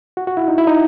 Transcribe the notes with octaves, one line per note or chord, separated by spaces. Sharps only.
F#4
F#4
E4
D#4
E4
D#4